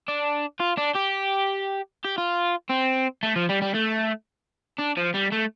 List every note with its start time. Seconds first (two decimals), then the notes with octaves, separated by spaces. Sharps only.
0.08 D4
0.60 F4
0.78 D4
0.95 G4
2.04 G4
2.18 F4
2.70 C4
3.23 A3
3.36 F3
3.49 G3
3.62 G3
3.75 A3
4.79 D4
4.97 F3
5.14 G3
5.32 A3